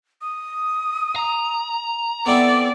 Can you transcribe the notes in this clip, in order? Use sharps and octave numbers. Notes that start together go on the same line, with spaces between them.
D#6
A#5
B3 C4 E4 A4 D5